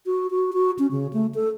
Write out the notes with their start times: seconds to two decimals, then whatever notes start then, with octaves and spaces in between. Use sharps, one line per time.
0.06 F#4
0.30 F#4
0.53 F#4
0.79 C#4
0.91 C#3
1.13 A3
1.35 A4